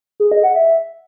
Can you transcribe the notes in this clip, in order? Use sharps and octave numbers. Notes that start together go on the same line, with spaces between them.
G#4
D#5
F#5
E5